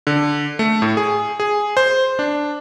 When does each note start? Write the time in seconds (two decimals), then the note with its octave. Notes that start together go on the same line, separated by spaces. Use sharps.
0.07 D3
0.59 A3
0.82 A2
0.97 G#4
1.40 G#4
1.77 C5
2.19 D4